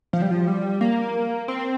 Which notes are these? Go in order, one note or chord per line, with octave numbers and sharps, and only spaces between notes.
F3
G3
F3
G3
A#3
C4